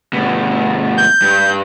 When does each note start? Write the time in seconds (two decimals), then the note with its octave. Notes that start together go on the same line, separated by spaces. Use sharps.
0.13 G2 B2
0.98 G6
1.22 G2